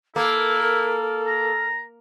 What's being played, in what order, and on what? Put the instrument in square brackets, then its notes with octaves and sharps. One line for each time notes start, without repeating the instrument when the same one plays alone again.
[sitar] A#3 [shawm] E4 [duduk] A4 [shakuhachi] A#4
[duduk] A4
[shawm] A#5